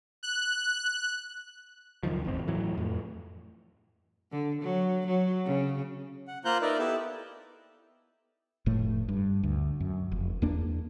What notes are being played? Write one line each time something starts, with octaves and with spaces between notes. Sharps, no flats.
F#6
C#2 F#2 D#3 F3
D1 G1 E2 C4
A2 E3 F#3
F2 A2
D3
F#3
F#3
C#3
F#5
A#3 F4 C5 A#5 F#6 G6
D#4 A#4 B4 D5 E5
B3 E4 G4 A4 E5 A5
F1 A2 A3
G2
D2
F#2
F1
E2 A#3 D4